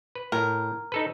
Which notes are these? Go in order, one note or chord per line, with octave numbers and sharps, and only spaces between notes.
B4
A2 A#4
D#4 A4 B4